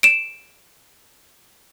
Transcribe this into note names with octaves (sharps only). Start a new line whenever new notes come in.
D7 E7